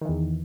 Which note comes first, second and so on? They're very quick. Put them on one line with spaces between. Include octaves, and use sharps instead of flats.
D#3 E3 E2